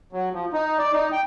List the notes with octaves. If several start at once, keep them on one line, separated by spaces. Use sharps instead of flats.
F#3
F3
D#4
D5
D#4
G5